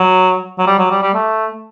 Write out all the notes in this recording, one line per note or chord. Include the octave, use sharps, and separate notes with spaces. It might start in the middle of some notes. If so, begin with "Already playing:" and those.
Already playing: F#3
F#3
G3
F#3
G3
G3
A3